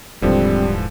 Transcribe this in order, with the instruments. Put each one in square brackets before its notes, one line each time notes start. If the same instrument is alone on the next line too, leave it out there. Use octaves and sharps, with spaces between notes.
[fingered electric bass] D#1 G#2 [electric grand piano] D3 E3 F3 [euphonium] G3 [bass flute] C4